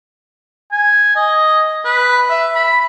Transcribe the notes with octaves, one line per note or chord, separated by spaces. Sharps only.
G#5
D#5
B4
E5
B5